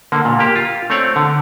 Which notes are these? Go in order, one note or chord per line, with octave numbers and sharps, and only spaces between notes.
D3 A#3
A#2
A#3 G4
F4
A3 C4 C#5 D5
D3